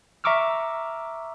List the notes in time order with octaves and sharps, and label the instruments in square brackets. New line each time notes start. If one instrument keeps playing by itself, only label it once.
[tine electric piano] E5 A#5 C#6 D6 E6 F6